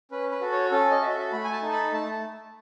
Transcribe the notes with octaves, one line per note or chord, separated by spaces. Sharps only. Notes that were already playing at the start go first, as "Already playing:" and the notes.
C#4 B4
B4
F#4 A4
C#5
C#4 A4
D#5
F#4 A4 E5
A3 B5
G#5
A5
D#4 A4
B5
A3 A5